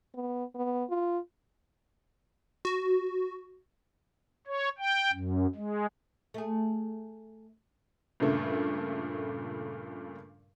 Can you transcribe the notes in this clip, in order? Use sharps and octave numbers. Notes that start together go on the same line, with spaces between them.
B3
B3
F4
F#4
C#5
G5
F#2
G#3
A3 G#4
G2 A#2 C#3 A3